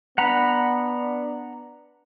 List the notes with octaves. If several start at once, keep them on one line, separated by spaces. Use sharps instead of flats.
B3 D4 F#5 A#5 B5